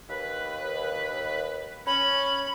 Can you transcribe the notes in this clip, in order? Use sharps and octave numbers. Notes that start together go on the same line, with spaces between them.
D#2 B4
C#4 B5